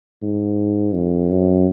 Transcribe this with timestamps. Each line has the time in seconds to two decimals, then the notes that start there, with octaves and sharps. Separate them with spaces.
0.23 G#2
0.95 F2
1.31 F#2